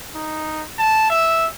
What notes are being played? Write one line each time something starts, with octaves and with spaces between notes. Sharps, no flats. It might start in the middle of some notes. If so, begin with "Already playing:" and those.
D#4
A5
E5